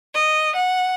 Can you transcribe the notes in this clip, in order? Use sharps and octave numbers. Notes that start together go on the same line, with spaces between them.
D#5
F#5